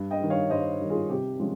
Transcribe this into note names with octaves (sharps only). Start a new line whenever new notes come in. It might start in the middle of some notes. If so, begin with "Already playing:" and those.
Already playing: G2
D#5 G5
D#3 G3
C#5 F5
G2 C5 D#5
D#3 G3
F4 G#4
C3 G4
F3 G#3 C#4